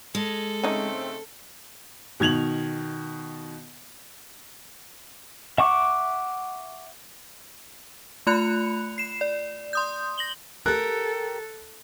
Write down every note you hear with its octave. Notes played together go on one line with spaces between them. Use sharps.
G#3 A4
C#3 A3 C4 C#4 D#4
B2 D#3 G#6 F7 F#7
E5 F#5 C#6 D6
A3 F4 B5 F#6 C#7 F7
C7 E7
D5
C6 D#6 G6
A#6 F#7 G7
G4 A4 A#4 F#6